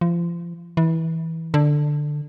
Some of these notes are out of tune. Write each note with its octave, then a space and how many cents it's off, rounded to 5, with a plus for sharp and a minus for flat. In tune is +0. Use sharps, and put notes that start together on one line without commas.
F3 -30
E3 -20
D3 +10